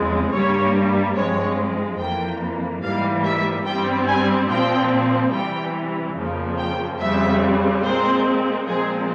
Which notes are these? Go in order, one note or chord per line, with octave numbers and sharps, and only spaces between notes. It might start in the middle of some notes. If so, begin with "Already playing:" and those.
Already playing: E2 C#3 F3 G#3 C4
G2 G3 A#3 C#5
G2 F3 G#3 C4 C#5
F2 E3 A#3 G5
G#2 E3 G3 A#3 F5
E5
G2 G3 C4 G5
G#5
A#2 F3 C4 G5
C3 E3 G3 G5
F2 C#3 F3 A#3
G5
F2 C#3 G3 C4 E5
A#2 G#3 C4 C5
A#2 F3 G#3 C4 G#4